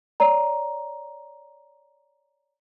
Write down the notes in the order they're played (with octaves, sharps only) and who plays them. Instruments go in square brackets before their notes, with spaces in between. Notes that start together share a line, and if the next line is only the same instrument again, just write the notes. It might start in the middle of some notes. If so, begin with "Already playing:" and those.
[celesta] C#5 D5 A#5